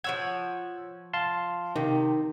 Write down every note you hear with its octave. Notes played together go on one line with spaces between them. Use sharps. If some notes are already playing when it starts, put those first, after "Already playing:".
F3 C#5 F#5 E6 G#6
F5 A5 C6
C3 D#3